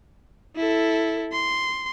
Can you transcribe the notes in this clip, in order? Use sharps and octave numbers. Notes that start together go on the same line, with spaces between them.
E4 A4
C6